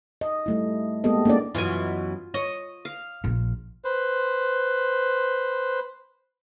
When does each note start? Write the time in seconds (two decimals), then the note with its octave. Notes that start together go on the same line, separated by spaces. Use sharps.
0.21 D#5
0.46 G3 A3 E4
1.04 G#3 A#3 B3 G4 A4 D#5
1.25 A#3 C#4 D4 E4 D5
1.55 F#2 B2 E3 F4 G#5
2.34 C#5 D#5
2.85 F5
3.24 A#1 F3
3.85 B4 C5